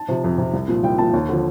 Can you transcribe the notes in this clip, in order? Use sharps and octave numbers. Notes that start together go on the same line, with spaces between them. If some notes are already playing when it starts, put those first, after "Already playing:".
Already playing: A5
C3 F3
F2
C3 F3
C2
A#2 F3
C2 G5
A#2 F3 A5
D#2
D3 F3